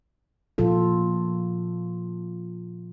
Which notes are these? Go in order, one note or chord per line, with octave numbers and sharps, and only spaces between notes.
A#2 F3 F4 A4